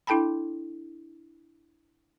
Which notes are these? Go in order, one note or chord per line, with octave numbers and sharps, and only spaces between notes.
D4 E4 A4 G5 A5 B5